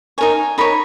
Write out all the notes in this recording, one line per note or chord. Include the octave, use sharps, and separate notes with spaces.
D#4 A#4 C#5 G#5
D#4 A#4 C#5 B5